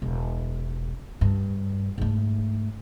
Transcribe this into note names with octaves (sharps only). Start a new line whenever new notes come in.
E1
G2
G#2 A3